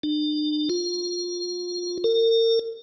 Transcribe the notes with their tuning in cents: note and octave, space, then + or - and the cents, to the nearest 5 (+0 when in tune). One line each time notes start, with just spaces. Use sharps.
D4 +45
F4 +20
A#4 -40